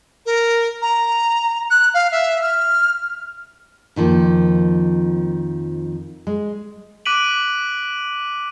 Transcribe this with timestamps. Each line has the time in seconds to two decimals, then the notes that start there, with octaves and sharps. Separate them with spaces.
0.26 A#4
0.82 A#5
1.71 F#6
1.94 F5
2.12 E5
2.42 F6
3.96 F2 D#3 F3 A#3
6.27 G#3
7.06 D6 F#6 B6 D7 D#7 F#7